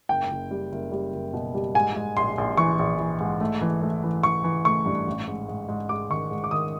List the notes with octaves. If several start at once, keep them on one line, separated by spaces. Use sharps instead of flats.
F#1 G5
F#1
G3
F#1
G3
F#1
B2
G3
G#2 G#5
G#2
A#1 C6
A#1
E3 C#6
A#1
E3
G#2
A3
E3
A3
E3
E3 C#6
E3
A3 C#6
G2
A1
G#2
G#2
G#2
G#3 D6
D#3 C#6
G#2
D6
D#3 D#6